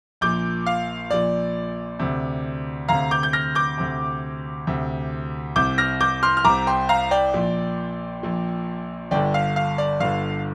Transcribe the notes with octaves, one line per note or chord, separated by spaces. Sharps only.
A#1 A#2 D6 G6
F5
A#1 A#2 D5
D2 C3
D2 C3 F5 A#5
D6 G6
G6
F6 A#6
D6 G6
D2 C3
D2 C3
C2 C3 D6 G6
F6 A#6
D6 G6
C6 F6
F6
C2 C3 A#5 D6
G5 C6
F5 A#5
D5 G5
A#1 A#2
A#1 A#2
G1 G2 D3 D5 G5
F5
F5
D5
G1 G2 D3 F5